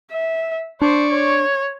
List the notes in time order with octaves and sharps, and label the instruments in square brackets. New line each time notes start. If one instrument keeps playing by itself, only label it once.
[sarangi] E5
[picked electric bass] D4 [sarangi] C5 [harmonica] D5 C#6
[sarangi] C#5